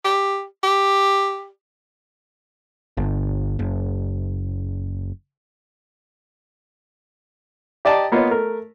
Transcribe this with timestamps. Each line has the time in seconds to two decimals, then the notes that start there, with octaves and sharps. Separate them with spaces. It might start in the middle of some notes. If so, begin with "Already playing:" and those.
0.05 G4
0.64 G4
2.97 G1
3.59 F#1
7.85 G4 D5 D#5 A5 A#5
8.12 A#3 B3 F4 C#5 D#5
8.30 A3 A#4